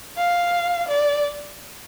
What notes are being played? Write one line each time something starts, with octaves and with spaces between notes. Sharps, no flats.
F5
D5